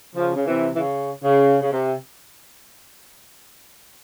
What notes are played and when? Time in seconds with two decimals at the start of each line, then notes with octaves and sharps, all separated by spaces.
0.16 C#3 F3
0.35 C#3
0.47 C3 E3
0.74 E3
0.78 C#3
1.24 C#3
1.62 C#3
1.71 C3